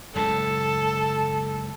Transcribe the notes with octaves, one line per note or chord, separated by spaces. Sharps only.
F#1 C#2 A2 A4